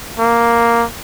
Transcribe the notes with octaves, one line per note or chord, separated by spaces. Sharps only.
A#3